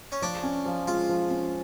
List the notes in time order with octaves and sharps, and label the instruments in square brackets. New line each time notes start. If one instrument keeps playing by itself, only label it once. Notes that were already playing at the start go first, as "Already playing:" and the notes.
[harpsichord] C#4
[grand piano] F3 [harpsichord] D4
[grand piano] C#4
F3
[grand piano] G#3 [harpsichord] F4
[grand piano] F3
C#4